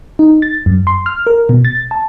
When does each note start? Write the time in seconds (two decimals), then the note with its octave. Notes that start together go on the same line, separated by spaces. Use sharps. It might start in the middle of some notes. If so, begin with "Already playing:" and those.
0.19 D#4
0.42 A6
0.66 F#2
0.87 C6
1.06 F6
1.27 A#4
1.49 B2
1.65 A6
1.91 A5